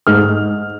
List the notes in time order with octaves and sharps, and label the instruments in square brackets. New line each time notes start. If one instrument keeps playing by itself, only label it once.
[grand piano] G#2 F6